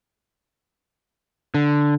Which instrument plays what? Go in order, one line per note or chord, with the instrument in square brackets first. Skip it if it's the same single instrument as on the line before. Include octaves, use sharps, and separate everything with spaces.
[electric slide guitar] D3